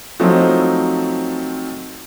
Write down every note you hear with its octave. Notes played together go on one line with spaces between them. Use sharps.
F3 F#3 A3 C4 D#4